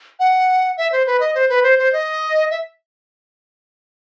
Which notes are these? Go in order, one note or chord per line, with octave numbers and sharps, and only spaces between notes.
F#5
E5
C5
B4
D#5
C5
B4
C5
C5
D#5
E5